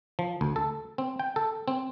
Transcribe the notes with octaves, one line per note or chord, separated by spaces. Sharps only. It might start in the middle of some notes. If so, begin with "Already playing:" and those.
F3
D2
A4
C4
G5
A4
C4